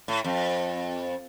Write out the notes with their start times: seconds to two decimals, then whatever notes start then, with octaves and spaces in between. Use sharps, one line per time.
0.08 A2
0.24 F2